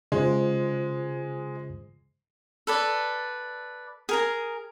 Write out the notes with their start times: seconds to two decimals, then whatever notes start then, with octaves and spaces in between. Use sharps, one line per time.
0.12 C#3 G#3 F4 C5
2.67 A4 B4 D5
4.09 G#4 A#4 A#5